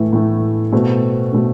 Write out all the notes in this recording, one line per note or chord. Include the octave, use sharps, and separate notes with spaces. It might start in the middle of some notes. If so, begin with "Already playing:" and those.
Already playing: A2 E3 A3
A2 E3 A3
B2 A3 C4
B2 A3 C4